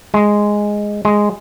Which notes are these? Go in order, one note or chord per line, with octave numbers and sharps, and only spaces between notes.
G#3
G#3